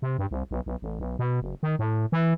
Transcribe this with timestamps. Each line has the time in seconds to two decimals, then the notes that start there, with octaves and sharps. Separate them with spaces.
0.02 C3
0.19 G2
0.31 C2
0.51 B1
0.66 B1
0.82 A1
1.00 B1
1.19 B2
1.42 F#1
1.63 D#3
1.79 A2
2.12 E3